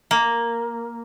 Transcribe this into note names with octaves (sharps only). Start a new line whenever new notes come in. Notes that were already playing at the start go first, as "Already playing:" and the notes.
A#3